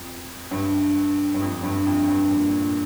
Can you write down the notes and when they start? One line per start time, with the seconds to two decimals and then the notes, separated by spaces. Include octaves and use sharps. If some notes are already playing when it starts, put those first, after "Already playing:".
Already playing: F2
0.51 G2
1.34 G2
1.41 F2
1.63 G2
1.87 F2
2.08 G2
2.31 A#2